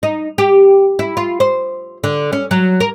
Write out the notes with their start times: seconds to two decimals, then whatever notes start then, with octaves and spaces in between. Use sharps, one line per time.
0.03 D#4
0.38 G4
0.99 E4
1.17 F4
1.40 C5
2.04 D3
2.33 C#4
2.51 F#3
2.80 A#4